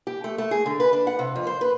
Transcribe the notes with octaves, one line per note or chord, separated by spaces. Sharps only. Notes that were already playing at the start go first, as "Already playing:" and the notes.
G4
A3
A3
G#4
D3
B4
D4
F#5
C3
F2
C5
B4